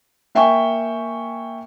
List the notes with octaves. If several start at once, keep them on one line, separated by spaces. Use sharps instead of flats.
A#3 E5 G5 G#5 C#6